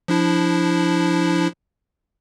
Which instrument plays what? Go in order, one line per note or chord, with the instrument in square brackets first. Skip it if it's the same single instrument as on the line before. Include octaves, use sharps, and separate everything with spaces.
[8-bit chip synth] F3 D4 E4